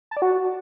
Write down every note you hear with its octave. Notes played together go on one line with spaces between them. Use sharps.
A5
D5
F#4